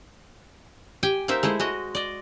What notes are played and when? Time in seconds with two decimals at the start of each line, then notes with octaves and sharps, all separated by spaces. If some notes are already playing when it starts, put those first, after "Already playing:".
1.03 G4 G5 G#5
1.28 A#3 D#4 C5 E5
1.43 G#3 A3 E4 C5
1.60 G#3 F#4 D#5
1.95 D5 D#5